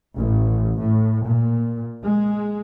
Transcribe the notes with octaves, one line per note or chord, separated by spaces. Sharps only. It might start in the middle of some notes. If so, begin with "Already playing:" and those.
A1
A2
A#2
G#3